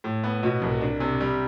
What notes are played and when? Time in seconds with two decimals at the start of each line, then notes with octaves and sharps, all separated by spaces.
0.04 A2
0.23 B3
0.43 B2
0.62 C2
0.81 D4
1.00 C3
1.20 G3